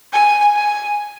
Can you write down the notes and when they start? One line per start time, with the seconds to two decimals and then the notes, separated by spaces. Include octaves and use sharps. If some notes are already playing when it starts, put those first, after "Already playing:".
0.13 G#5
0.56 G#5